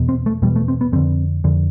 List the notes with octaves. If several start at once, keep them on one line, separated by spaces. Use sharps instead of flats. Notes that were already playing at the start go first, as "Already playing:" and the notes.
Already playing: E2 B2
C4
A3
E2 B2 G3
A3
C4
B3
F2 D3 C4
F2 D3